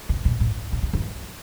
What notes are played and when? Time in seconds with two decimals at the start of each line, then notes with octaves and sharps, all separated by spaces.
0.09 C3
0.25 B2
0.40 A2
0.72 B2
0.83 C3
0.93 E3